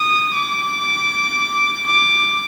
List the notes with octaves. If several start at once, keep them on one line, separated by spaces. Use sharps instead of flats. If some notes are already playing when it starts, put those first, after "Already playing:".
Already playing: D#6
D6
D6